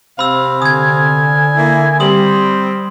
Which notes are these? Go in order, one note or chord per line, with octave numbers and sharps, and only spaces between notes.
C3 C4 F5 B5 E6
D3 G#5 D#6 G#6
A#3 E4
G3 C4 D#6 F#7